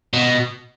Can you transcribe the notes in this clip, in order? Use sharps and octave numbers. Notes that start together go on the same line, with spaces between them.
B2